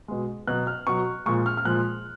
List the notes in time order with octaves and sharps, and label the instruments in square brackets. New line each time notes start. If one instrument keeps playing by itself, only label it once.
[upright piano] B2 G#3
B2 F#3 F#6
F6
B2 F#3 C#6
A#2 F3 G#3 C#6
F6
F6
A#2 F3 G#3 F#6